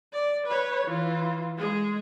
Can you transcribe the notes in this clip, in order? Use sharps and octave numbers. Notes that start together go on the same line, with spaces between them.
D5
B4 C#5
E3 F4
G#3 G#4